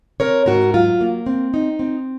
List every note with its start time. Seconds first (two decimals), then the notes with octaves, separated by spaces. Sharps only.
0.20 C4 A#4 C#5
0.46 G#2 F#4 A#4
0.74 F#3 F4
1.01 A#3
1.26 C4
1.54 D#4
1.79 C4